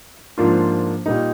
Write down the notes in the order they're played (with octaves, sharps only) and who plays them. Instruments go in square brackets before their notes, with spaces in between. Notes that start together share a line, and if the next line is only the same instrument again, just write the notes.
[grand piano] G#2 F3 A#3 D4 F4
A#2 G3 A#3 D#4